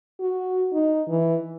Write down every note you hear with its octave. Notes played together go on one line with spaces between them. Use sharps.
F#4
D#4
E3